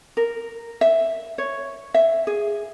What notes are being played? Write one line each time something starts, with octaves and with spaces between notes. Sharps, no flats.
A#4
E5
C#5
E5
G#4